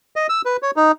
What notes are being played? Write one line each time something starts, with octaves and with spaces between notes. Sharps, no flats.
D#5
E6
B4
C#5
D#4